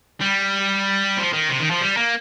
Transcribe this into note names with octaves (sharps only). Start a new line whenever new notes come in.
G3
F3
D#3
C3
D#3
F3
G3
A#3